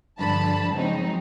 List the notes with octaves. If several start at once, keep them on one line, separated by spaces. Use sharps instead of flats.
G2 D3 F3 A5 B5
C#3 F3 F#3 G#3 C4 D#4